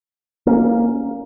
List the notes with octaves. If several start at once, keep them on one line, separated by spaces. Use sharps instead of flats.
A#3 C#4